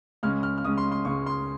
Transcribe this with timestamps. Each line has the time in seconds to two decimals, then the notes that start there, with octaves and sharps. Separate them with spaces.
0.23 C#2 C#3 G#3 C#4 F6
0.43 F6
0.58 F6
0.64 C#2 C#3 G#3 C#4 D#6
0.78 C6
0.92 C6
1.05 C#2 C#3 G#3 C#4 C#6
1.27 C6